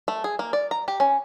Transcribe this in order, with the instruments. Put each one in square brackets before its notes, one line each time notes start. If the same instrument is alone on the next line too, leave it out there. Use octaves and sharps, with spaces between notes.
[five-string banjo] A3
G#4
A#3
D5
A#5
G4
C#4